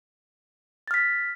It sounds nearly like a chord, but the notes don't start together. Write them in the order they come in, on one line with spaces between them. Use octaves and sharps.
A6 F6 B6